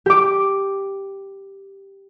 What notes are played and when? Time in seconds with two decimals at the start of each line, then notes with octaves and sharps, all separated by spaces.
0.06 G4 D6